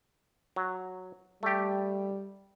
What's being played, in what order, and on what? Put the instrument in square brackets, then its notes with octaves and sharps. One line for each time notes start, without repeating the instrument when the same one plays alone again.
[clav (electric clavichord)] F#3
[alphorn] G3 [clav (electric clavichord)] A3 G4